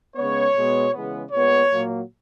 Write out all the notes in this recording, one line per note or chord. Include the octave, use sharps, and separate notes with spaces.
C#3 G#3 B3 C#5
B2 G#3 B3
C#3 E3 G#3 B3
A#2 G#3 B3 C#5
A#2 F#3 A#3